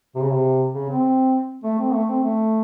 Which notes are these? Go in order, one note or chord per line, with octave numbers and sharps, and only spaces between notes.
C3
C#3
C3
C#3
C4
A3
C4
A3
C4
A3